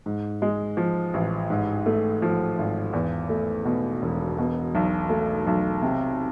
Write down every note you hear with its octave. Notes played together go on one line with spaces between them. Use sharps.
G#2
G#3
F3
A1
G#2
A3
F3
G#1
E2
A3
B2
E1
B2
B1
A3
B1
C3